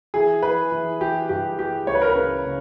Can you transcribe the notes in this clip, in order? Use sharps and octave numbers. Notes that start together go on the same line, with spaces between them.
E3 G#4
E3 B4
E3
E3 G4
G2 G4
E3 G4
C#2 C#5
B4
A#4
B4
C#3
C#3